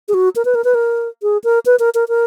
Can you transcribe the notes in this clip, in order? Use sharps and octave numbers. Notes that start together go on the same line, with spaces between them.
G#4
F#4
A#4
B4
A#4
B4
A#4
G#4
A#4
B4
A#4
A#4
A#4